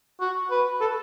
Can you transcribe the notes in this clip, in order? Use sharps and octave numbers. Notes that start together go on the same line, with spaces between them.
F#4
B4
A4